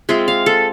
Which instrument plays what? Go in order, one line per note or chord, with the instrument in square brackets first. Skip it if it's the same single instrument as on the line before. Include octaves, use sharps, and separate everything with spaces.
[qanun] G#3 C4 F4 E5
F5
A4